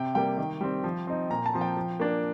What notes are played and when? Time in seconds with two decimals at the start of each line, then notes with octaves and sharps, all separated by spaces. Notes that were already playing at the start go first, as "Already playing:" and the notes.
Already playing: C3 G5
0.15 G3 A#3 G5
0.38 D#3
0.61 G3 C4
0.84 F3
1.07 C4 D#4
1.30 A#2 A#5
1.46 A5
1.53 F3 C4
1.61 G5
1.77 F3
2.00 A#3 D4